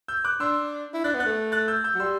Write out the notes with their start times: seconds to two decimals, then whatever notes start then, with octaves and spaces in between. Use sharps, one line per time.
0.08 E6 G6
0.25 D6 F#6
0.40 D4 C6 E6
0.93 E4
1.04 D4 F#6 A6
1.14 B3
1.20 F#6 A6
1.26 A3
1.52 F#6 A6
1.68 E6 G6
1.84 E6 G6
1.95 F#3
2.00 G3 C6 E6